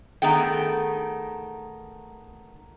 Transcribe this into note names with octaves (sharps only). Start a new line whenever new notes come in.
D#3 A3 B3 G#4 G5